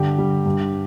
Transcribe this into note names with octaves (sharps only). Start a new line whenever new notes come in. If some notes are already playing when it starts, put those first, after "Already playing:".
Already playing: G2 D3 G4
G3
G2